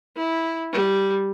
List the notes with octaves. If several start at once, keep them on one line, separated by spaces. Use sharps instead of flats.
E4
G3